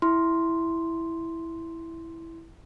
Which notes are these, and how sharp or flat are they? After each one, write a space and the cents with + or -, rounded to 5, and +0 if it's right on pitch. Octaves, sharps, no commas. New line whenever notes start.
E4 +0 C6 +0